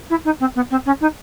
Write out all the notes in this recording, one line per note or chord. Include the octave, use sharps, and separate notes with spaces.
E4
D#4
C4
B3
C4
C#4
D#4